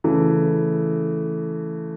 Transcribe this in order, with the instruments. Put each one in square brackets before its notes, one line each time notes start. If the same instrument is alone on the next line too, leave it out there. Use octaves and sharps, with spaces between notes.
[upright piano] C#3 E3 A3